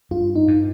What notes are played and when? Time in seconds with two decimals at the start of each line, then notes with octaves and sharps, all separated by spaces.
0.11 G2 F4
0.36 D#4
0.48 G2